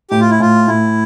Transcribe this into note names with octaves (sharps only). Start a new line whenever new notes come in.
A2 G4
F4
E4
A2 F4
A2 E4